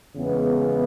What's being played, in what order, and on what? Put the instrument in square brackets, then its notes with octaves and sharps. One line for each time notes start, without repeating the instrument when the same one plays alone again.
[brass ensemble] E2 C#3 E3 G#3 B3